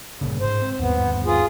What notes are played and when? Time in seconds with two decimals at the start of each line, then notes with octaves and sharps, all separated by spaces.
0.21 G1 A#2 C#3
0.40 G#2 C5
0.62 C4
0.79 G1 D#2 B3
1.25 F4 G#4